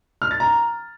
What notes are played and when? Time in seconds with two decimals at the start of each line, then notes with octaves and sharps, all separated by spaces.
0.22 F6
0.31 A6
0.40 A#5